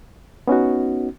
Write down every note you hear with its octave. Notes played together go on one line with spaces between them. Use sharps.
B3 C#4 D#4 F#4